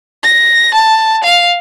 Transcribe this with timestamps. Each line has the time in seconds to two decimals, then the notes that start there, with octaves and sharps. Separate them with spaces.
0.24 A#6
0.74 A5
1.24 F5